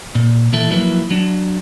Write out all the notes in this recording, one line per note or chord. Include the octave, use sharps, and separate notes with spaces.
A#2
A#2 E3 E4 A4
F3 F#3 A#3 E4 B4
F#3 D4